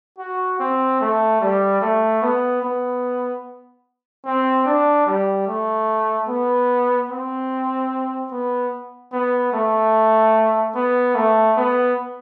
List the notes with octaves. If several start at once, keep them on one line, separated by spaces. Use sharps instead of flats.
F#4
C4
A3
G3
A3
B3
B3
C4
D4
G3
A3
B3
C4
B3
B3
A3
B3
A3
B3